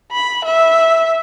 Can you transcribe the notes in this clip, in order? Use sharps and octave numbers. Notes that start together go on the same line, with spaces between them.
B5
E5